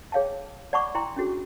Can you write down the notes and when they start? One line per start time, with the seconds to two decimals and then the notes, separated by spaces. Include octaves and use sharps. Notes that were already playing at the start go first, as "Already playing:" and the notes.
0.12 G#4 C#5 F5 G5 A5
0.73 D5 F#5 A5 B5 C#6 D6
0.95 E4 G5 A#5 C6
1.17 C#4 D4 F#4 G#4